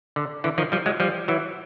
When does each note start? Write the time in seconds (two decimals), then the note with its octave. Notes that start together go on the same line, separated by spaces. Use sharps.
0.16 D3
0.44 D3 E3
0.58 D#3 F3
0.72 F3 G3
0.86 F#3 G#3
1.00 F3 G3
1.28 E3 F#3